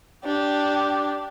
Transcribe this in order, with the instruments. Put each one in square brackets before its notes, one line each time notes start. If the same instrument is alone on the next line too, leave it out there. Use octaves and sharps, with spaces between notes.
[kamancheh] D4 G4